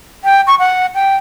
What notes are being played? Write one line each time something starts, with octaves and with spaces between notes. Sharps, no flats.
G5
C#6
F#5
G5